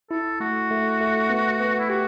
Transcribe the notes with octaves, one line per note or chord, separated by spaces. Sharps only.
E4 A4
A3 F#4
A3
A3
B3
B3
E4
F#4 G4